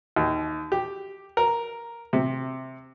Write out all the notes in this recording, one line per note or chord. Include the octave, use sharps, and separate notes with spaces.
D#2
G4
A#4
C3